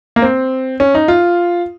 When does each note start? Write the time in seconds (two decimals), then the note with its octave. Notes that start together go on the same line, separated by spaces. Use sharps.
0.16 A#3
0.22 C4
0.80 C#4
0.95 D#4
1.08 F4